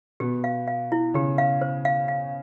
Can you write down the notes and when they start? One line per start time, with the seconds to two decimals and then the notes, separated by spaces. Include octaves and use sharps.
0.20 B2 B3 G4
0.44 F5
0.67 F5
0.92 E4
1.14 C#3 C#4 G4
1.38 F5
1.61 C5
1.85 F5
2.08 F5